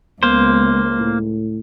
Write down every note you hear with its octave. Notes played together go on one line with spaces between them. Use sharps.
C#2 A#3 B3 C5
A2